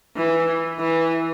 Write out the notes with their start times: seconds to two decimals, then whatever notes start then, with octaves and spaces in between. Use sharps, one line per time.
0.16 E3
0.79 E3